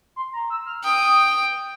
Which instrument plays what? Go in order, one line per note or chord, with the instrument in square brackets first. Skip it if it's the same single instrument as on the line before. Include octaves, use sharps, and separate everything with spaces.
[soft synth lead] C6
A#5
E6
F6
[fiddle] G5 [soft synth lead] D#6